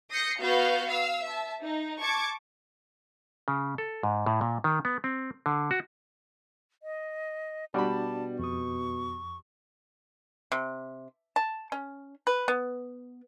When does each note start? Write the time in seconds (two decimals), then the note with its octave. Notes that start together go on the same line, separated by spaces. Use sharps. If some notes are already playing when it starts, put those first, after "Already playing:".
0.11 D#6 G6 A#6 C7 C#7
0.41 B3 F#4 F5 G6
0.87 F5 E6
1.23 E5 A5
1.61 D#4
1.99 A5 C#6 D6 G#6
3.48 C#3
3.78 A4
4.03 G#2
4.26 A2
4.41 A#2
4.64 D#3
4.85 B3
5.04 C4
5.46 D3
5.71 F#4
6.83 D#5
7.74 B2 G3 D4 F#4 D5 A5 B5
8.39 F2 C#6 D#6
10.52 C3
11.36 A5
11.72 C#4
12.27 B4
12.48 B3